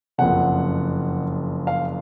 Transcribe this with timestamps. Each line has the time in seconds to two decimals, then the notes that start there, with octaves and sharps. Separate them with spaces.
0.18 F#1 F2 C#3 F#5
1.67 F5